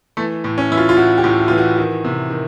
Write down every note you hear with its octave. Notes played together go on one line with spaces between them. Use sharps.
E3 A3
A2
C#4
E3 E4
F4
F4
A2 F#4
G4
A2
F#4
E3 F4
F#4
D#3 F#4
C3
D#3